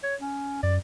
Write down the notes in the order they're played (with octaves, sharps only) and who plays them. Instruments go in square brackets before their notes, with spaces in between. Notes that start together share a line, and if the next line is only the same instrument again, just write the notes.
[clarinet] C#5
C#4
[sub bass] F#2 [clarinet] D5